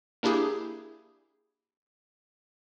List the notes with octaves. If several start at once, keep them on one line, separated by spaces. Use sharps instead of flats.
A#3 D4 E4 G4 G#4